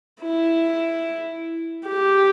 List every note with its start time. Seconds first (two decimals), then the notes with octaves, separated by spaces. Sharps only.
0.22 E4
1.88 G4